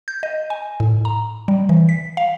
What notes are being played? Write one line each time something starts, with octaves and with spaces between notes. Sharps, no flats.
G6
D#5
G#5
A2
A#5
G3
E3
B6
F5